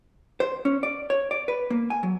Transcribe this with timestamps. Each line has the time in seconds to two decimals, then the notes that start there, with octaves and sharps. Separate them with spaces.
0.40 C5
0.65 C#4
0.83 D5
1.10 C#5
1.31 D5
1.48 B4
1.70 A#3
1.90 G#5
2.03 F#3